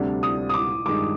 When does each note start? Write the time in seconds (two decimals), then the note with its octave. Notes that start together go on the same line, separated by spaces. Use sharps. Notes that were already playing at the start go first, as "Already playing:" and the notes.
Already playing: D2 C3 G3 D4
0.23 D#6
0.49 D#6
0.54 D6
0.85 G2 D#3 G#3 D6